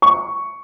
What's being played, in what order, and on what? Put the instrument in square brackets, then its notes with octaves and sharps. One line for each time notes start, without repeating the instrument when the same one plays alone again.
[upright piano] C#6